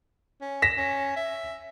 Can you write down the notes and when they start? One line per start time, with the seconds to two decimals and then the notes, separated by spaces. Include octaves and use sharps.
0.41 C#4
0.62 A#6 B6 E7
0.77 C#4
1.16 E5